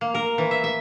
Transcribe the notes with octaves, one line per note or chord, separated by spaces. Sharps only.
A#3
A#4
E3
E5
E5